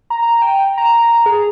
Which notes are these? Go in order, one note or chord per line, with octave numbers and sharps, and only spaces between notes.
A#5
G5
A#5
G#4